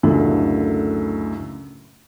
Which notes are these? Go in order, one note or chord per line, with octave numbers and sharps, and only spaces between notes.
C#2 F#2 A2 D3